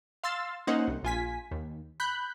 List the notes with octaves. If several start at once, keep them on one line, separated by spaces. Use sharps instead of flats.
F5 C6 E6 A6
A#3 C#4 D#4 C5 F#5
C2
A#1 F4 G#5 B6
D#2
B5 F#6 G6